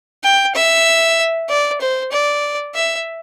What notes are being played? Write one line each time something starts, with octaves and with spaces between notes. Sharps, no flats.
G5
E5
D5
C5
D5
E5